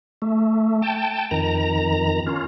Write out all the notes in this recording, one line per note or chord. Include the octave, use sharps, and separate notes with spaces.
A3
G5 A5
F2 D#3 A#5
C#4 F4